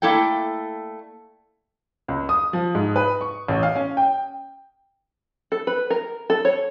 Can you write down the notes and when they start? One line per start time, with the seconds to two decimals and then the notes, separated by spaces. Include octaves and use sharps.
0.02 A3 A#3 E4 A4 D5 G5
2.08 C#2
2.29 D#6
2.53 F3
2.75 G#2
2.96 B4
3.21 C#6
3.48 A1
3.63 F5
3.75 C#4
3.97 G5
5.52 A4
5.67 B4
5.90 A#4
6.30 A4
6.45 C#5